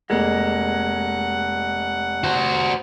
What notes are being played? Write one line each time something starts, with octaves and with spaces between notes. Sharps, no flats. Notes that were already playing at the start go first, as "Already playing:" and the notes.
F1 G#3 A#3 F#5
F#4 C5